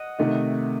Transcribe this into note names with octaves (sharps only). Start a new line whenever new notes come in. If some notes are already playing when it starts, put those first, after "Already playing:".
Already playing: D#5 F#5
C3 D#3 A3 D#4